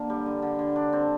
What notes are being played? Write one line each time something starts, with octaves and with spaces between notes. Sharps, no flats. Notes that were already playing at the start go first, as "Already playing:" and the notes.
Already playing: D3 A#3
G3
D3
D3
D3
D4
C4